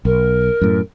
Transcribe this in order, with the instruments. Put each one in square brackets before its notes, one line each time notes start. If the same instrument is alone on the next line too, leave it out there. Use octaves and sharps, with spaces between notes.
[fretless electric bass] B1 [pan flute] A#4
[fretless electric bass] F#2 A2